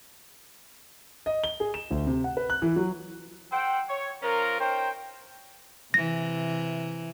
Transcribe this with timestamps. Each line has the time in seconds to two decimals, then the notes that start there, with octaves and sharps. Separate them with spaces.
1.26 D#5
1.44 G7
1.60 G#4
1.74 E7
1.91 D2
2.07 C3
2.24 F#5
2.37 B4
2.50 F#6
2.62 E3
2.76 F#3
3.52 A4 C5 F#5 G5
3.89 C#5
4.22 F3 C#4 F4 A#4
4.60 C#4 D#4 A#4 C5 G5
5.94 C3 E3 A#6